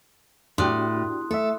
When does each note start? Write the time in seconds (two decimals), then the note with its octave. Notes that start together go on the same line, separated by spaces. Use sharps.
0.58 A2 D4 F#4 G4 C6 D#6 F#6
1.31 A3 A4 E5